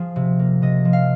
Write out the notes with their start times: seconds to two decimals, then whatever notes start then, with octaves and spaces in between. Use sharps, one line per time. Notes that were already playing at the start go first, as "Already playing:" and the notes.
Already playing: F3 G#4
0.16 C3
0.39 A#3
0.62 C3 D#5
0.85 F3
0.93 F5